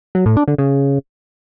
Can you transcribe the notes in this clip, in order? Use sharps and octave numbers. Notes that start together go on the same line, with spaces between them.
F#3
A2
D4
D3
C#3